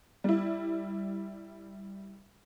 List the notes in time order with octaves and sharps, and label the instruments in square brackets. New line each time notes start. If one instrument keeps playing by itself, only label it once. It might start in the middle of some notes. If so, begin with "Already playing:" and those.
[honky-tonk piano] G3 E4